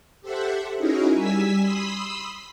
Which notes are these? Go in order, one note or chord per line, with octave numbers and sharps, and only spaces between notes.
G4 A4 C5 E5 F#5
C#4 D#4 E4 F#4 G#4 A#4
G3 G#5 E6 B6
B5 C6 D#6 E6 B6